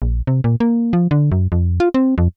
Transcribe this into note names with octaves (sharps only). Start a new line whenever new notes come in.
A#1
C3
A#2
A#3
F3
D3
F#2
F2
F4
C4
F2